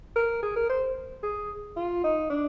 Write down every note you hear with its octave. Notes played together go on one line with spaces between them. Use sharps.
A#4
G#4
A#4
C5
G#4
F4
D#4
D4